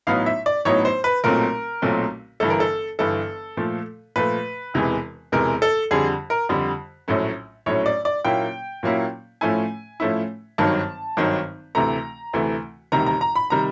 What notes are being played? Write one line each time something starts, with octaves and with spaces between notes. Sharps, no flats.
A1 A2 F#3 B3 D#4 F5
E5
D5
A1 A2 F#3 B3 D#4 C#5
C5
B4
B1 A#2 F#3 A3 C4 A#4
B1 A#2 F#3 A3 C4
G1 G2 E3 A4
A#4
A4
G1 G2 E3 A4
A#2 F3 A3
A#2 F3 A3 B4
E1 E2 C3 E3 G#3
E1 E2 C3 E3 G#3 A#4
A4
F2 D3 G3 G#4
A#4
F2 D3 G3
A#1 A2 F#3 A3 C#4
A#1 A2 F#3 A3 C#4 C#5
D5
D5
A#2 F#3 A#3 C#4 E4 G5
A#2 F#3 A#3 C#4 E4
A2 F3 A3 C#4 E4 G#5
A2 F3 A3 C#4 E4
G#1 G2 D#3 F#3 A5
G#1 G2 D#3 F#3
D2 C3 E3 A3 A#5
D2 C3 E3 A3
E1 D2 C3 D#3 G3 A#5
A#5
A#5
B5
C3 D#3 G3 A#5